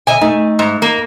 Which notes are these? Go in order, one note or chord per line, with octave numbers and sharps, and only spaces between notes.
D3 D#5 E5 G#5
A3 D#4
G#2
A#3